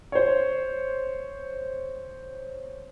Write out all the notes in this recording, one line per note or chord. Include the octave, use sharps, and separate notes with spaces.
C5 C#5